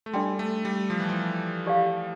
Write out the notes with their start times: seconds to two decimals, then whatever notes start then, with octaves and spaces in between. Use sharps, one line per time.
0.06 A3
0.13 G3 D4 A4 D5 G5 C6
0.39 A3
0.65 G3
0.90 F3
1.00 E3
1.09 F3
1.66 G4 D5 F5